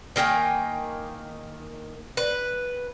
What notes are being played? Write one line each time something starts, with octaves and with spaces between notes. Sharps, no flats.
D#3 A#3 G5 G#5
B4